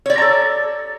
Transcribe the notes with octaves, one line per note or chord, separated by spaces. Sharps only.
G4 A4 C#5 D5 A#5